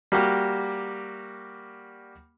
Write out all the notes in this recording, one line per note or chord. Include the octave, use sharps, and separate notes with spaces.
G3 A#3 F#4 G4